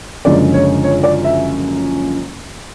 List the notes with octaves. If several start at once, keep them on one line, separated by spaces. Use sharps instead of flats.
F#1 F#2 D3 F3 G#3 D5
C#5
C#5
D5
E5